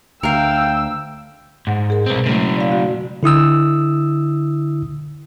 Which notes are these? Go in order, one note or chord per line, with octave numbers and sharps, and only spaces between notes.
D2 A#4 F5 G5 E6
G#2 F#5
G#4 A#4
C2 B2 C4
C#3 F#3 G#3 A3
D5 F5
F#4
D3 E4 D#6 E6